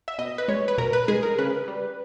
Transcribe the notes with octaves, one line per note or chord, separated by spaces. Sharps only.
E5
B2 D#5
B4
G#3 C#5
B4
B2 A#4
B4
G#3 G#4
A#4
C#3 B4
G3